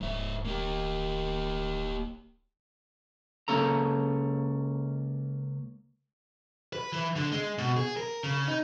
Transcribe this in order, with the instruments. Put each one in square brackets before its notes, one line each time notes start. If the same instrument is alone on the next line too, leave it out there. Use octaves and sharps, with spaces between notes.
[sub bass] D1 [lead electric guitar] G#2 E5
[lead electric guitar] A#3 G4
[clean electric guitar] C#2 A#3 C#4 A4 A#5
[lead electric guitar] B4
E3
D3
G#3
B2
G#4
A#4
C#3
D#4